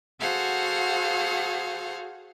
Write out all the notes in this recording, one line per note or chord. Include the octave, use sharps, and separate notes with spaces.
F#4 G#4 A4 C5 F5 F#5